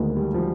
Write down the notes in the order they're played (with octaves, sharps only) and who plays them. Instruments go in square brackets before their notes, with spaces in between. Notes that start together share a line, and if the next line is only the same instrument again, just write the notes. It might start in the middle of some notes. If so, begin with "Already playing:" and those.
Already playing: [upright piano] D2 D#3 [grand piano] G#3 A#3
[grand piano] G3
F3